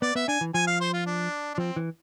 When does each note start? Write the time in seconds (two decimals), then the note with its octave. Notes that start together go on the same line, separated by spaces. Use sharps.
0.02 B3 D5
0.15 B3 E5
0.28 D4 G#5
0.41 E3
0.54 F3 G#5
0.67 F5
0.80 C5
0.93 F4
1.06 D4
1.54 D4
1.58 F3 C4
1.76 E3